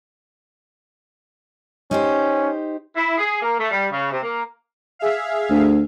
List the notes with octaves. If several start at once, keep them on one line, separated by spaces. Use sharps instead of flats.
C#4 D#4 G4 C5
E4
G#4
A#3
A3
G3
C#3
C3
A#3
G#4 E5 F5
D2